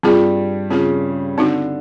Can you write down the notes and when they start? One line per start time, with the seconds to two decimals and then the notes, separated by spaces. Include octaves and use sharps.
0.03 G2 G3 C4 F4 G#4
0.70 C#3 C4 F4 G#4
1.37 D3 C4 D#4 F#4